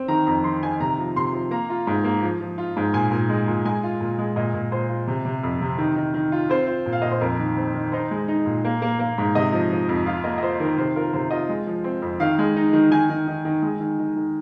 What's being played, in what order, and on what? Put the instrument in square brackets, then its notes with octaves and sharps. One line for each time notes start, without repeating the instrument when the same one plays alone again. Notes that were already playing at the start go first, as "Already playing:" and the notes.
Already playing: [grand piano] C4
D#3 A#5
F2 A#5
D#3 C6
D#3 G#5
C3 A#5
F3
C3 C6
F3
A#3 A#5
F4
G#2
A#3
F3
F3
F4
G#2
A#2 G#5
A#2
G#3
A#2
G#3 G#5
F4
A#2
G#3
A#2 D#5
A#2
A#2 C5
F4
C3
C3
F2
C3
D#3
D#3
D#3
F4
C4 C5
F4
A#2
F5
A#2 D#5
C5
F2 A#4
D#3
C4
D#3
D#4 C5
G#3
D#4
A#2
A#3
A#3
A#3
G#2
C3 D#5
F3
F3
F2
F4 F5
A#3 D#5
D#5
F4 C5
D#3 A#4
C3 C5
F4 A#4
C3 C5
F4 D#5
G#3
F3
C4
F2
D#3 F5
G#3
D#4
D#3
D#3 G#5
D#3
D#3
D#3
G#3
D#3
D#3
D#3